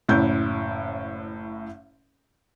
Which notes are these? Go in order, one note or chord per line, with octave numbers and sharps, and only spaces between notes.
F#1 A2 C#4 E4 G6